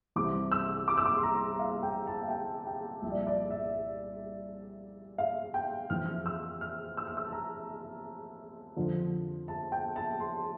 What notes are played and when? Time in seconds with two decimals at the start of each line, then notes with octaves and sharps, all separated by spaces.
0.16 C2 C3 E3 D6
0.52 E6
0.88 D6
0.98 E6
1.06 D6
1.17 C6
1.23 A#5
1.59 F5
1.83 G5
2.07 A5
2.23 F5
2.30 G5
2.67 G5
3.02 C2 A#2 F3 E5
3.10 D5
3.18 E5
3.27 D5
3.50 E5
5.18 F5
5.54 G5
5.90 F2 E3 F6
6.06 F6
6.26 E6
6.61 F6
6.97 E6
7.07 F6
7.17 E6
7.26 A5
7.32 A#5
7.81 A5
8.76 F2 D3 F3
9.48 A5
9.72 G5
9.96 A5
10.20 C6